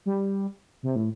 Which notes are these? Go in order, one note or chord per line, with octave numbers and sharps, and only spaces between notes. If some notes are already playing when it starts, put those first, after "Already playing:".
G3
C3
A2